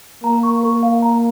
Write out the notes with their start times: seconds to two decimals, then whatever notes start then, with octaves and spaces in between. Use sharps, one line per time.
0.24 A#3 A#5
0.43 C#6
0.63 A#4
0.83 F5
1.02 A#5